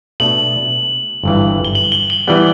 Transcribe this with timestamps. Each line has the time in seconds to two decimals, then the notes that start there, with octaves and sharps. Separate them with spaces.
0.20 B2 A3 D4 F#7
1.23 G1 G2 E3
1.65 G7
1.75 F#7
1.92 G7
2.10 F#7
2.28 E3 G3 B3